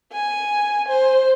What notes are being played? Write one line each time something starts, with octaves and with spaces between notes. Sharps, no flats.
G#5
C5